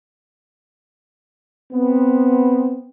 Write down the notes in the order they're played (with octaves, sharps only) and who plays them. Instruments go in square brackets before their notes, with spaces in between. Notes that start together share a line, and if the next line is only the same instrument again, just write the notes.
[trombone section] B3 C4